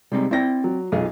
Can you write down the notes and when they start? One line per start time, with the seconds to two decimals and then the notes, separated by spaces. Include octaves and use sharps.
0.12 C3 G3 G#3 C4 D#4
0.31 C4 E4 D5 G5 A#6
0.64 F#3
0.92 B1 F4 G#4 D#5